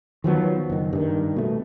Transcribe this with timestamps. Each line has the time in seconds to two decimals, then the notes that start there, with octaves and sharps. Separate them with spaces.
0.24 D#3 F3 F#3 B3
0.70 F#1 D#3
0.93 G2 D#3
1.36 B2 A3